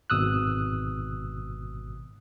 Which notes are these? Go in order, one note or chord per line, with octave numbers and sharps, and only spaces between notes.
G#1 B2 D#6 E6 F#6